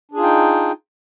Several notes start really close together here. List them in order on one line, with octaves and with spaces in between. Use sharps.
D4 G#4 F4 D#4 G5